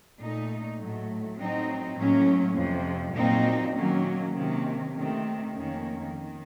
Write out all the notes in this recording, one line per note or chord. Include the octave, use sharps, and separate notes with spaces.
A#2 A3 D#4
A2 F#3 A3
A2 F#3 C4 D#4
A2 F#3 A#3 C#4
F2 C3 F3
A#2 F#3 C4 D#4
D#3 F#3 A#3 C#4
C3 D#3 A#3 C#4
C3 D#3 A3 C4
F2 D#3 A#3 C#4
D#3